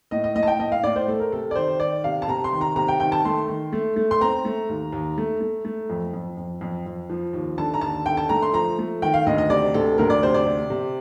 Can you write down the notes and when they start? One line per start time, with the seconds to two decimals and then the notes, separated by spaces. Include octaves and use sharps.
0.11 A2 D#5
0.24 D#5
0.35 A2 D#5
0.43 A5
0.47 G5
0.60 A2 D#5
0.72 F5
0.84 A2 D5
0.96 C5
1.08 A3 A4
1.20 A#4
1.32 C3 A4
1.51 D5
1.56 D#3 C5
1.80 D#3 D5
2.04 C3 F5
2.22 A5
2.28 C3 A#5
2.44 C6
2.53 D#3
2.61 A#5
2.76 C3 A#5
2.88 G5
3.00 D#3 G5
3.12 A5
3.25 A3 C6
3.48 D#3
3.73 A3
3.96 A3
4.11 C6
4.21 C4 A#5
4.45 A3
4.69 D#2
4.92 D#2
5.18 A3
5.41 A3
5.65 A3
5.90 F2
6.13 F2
6.37 F2
6.61 F2
6.86 F2
7.10 F3
7.33 D#2
7.57 D3 A5
7.74 A#5
7.81 D#2 A5
8.05 D3 G5
8.17 A5
8.29 A3 A#5
8.42 C6
8.53 F3 A#5
8.79 A3
9.02 D#3 G5
9.14 F5
9.26 D2 D#5
9.38 D#5
9.50 C3 D5
9.74 D2 A4
9.98 D2 A#4
10.10 D5
10.22 C3 C5
10.34 D5
10.46 C3
10.70 C3